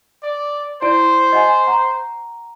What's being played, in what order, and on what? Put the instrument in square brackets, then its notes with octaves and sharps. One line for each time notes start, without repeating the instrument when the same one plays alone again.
[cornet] D5
[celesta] E4 D5 D7 [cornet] C5
[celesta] D#5 F#5 G#5
F#5 A#5 C#6